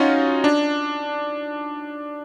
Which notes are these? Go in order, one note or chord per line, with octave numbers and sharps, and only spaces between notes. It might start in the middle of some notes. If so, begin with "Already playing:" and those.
Already playing: C#4 D#4 F4 F#4
D4